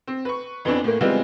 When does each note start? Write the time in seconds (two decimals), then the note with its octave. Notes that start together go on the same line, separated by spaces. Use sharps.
0.07 C4
0.25 B4 C#6
0.65 F2 E3 B3 C4 D4
0.84 A2 A3 A#3
1.01 E3 G3 G#3 B3 C4 F4